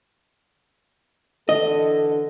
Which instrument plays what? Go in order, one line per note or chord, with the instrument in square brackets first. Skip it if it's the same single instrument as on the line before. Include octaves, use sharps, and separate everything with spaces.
[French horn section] D3 E3 A4 [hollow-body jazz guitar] D#5